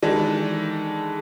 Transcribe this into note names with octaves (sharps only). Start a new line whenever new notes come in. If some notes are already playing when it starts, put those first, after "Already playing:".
D#3 E3 G#3 D4 A4